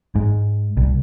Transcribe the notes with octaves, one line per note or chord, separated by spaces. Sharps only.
G#2
C2